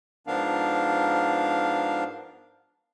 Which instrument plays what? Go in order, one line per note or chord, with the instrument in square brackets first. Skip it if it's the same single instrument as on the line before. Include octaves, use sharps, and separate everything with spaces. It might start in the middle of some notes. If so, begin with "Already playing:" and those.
[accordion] G#2 F3 B3 D4 A#4 F5